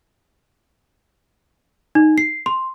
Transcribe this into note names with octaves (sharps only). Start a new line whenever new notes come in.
D#4
C7
C6